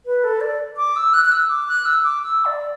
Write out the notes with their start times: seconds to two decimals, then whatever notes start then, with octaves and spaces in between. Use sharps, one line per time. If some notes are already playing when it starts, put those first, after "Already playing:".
0.06 B4
0.24 A4
0.41 D5
0.77 D6
0.96 E6
1.14 F#6
1.25 F#6
1.32 E6
1.49 D6
1.68 F#6
1.85 E6
2.03 D6
2.22 E6
2.45 D5